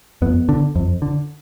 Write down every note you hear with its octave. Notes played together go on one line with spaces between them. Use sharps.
F2 B3
D3
F2
D3